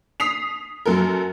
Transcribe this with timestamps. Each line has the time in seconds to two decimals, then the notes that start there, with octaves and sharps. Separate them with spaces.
0.20 D#6 B6 C7 F7
0.86 F#2 F#3 A4 A#4